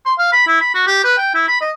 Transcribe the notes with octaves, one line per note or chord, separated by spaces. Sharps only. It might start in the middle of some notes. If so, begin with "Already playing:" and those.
C6
F5
B5
E4
B5
F#4
G4
B4
G5
E4
B5
D#5